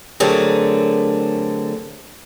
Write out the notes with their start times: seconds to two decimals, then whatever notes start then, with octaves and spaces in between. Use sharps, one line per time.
0.20 D3 F#3 A3 C4 G#4 A#4